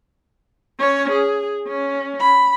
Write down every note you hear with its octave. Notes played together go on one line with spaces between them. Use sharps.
C#4 C#5
G#4
C#4
B5